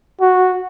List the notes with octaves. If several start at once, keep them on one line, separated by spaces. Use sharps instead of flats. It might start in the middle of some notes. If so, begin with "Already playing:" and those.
F#4